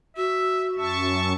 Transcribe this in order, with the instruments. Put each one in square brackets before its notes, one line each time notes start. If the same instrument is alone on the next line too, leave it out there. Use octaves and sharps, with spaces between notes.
[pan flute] F#4 [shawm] E5
[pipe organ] F#2 A5 C#6 [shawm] E5